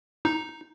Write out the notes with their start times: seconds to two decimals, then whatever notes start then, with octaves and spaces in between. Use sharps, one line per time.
0.25 D#4